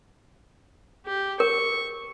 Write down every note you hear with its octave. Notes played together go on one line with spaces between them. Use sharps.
G4
A#4 C#6